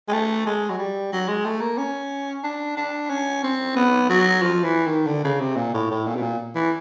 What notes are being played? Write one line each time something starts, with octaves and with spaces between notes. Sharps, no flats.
G#3
A3
G#3
F#3
G3
F#3
G#3
A3
A#3
C#4
D4
D4
C#4
C4
B3
F#3
F3
E3
D#3
D3
C#3
C3
A#2
A2
A2
A#2
B2
A#2
E3